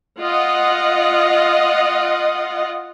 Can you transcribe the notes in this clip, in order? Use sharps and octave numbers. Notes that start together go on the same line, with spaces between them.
F4 D#5 F#5